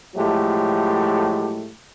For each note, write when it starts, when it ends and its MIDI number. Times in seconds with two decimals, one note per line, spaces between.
0.15 1.70 45
0.15 1.70 53
0.15 1.70 54
0.15 1.70 56
0.15 1.70 57
0.15 1.70 67